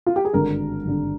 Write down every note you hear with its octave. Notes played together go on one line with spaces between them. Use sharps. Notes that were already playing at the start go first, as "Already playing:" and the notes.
F4
G4
G#4
G#1 G2 D3 A#4
G#1 G2 D3